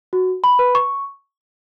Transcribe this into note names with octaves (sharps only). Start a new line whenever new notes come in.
F#4
B5
B4
C#6